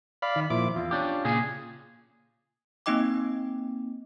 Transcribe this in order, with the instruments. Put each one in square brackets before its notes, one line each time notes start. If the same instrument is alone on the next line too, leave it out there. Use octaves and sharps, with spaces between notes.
[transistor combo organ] D5 F5 B5
[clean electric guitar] D#3
[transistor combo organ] A#2 E4 D6 [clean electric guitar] F3
[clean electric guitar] E2 [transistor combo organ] F4
[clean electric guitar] C#4 D4 G4
A#2 C#3 G#4
[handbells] A#3 C4 D#4 D#5 G5 D6